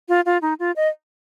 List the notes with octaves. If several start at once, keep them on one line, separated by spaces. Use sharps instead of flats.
F4
F4
D#4
F4
D#5